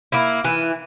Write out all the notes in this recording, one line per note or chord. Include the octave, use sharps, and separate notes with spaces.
A#3 E4
E3